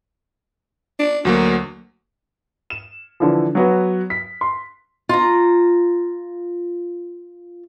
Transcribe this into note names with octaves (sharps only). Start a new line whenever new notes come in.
D4
D2 F#3 A#3 F#4
E7
D3 E3 F3
F#3 B3 F#4
B6
C6
F4 A#5